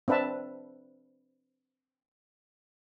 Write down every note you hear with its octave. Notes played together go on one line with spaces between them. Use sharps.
C4 D4 B4 E5 A5